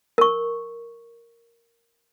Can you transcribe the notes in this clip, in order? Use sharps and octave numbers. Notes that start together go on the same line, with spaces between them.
A#4 C#6